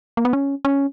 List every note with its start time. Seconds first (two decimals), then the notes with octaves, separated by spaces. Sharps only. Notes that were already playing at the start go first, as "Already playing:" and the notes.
0.17 A#3
0.25 B3
0.33 C#4
0.65 C#4